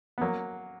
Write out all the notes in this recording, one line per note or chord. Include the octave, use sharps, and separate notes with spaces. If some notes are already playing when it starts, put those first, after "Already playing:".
B3
F#3 A#3